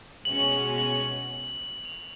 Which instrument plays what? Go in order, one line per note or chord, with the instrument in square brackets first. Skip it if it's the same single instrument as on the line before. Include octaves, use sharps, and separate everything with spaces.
[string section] B2 G#3 C#4 F#4 [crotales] F#7
[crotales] F#7
F7